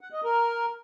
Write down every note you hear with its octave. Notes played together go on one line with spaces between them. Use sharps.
F#5
D#5
A#4